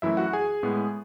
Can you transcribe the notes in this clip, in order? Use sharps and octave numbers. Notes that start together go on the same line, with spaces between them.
F#2 E3 A3 E4 E5
F#4 F#5
G#4 G#5
A2 G#3 B3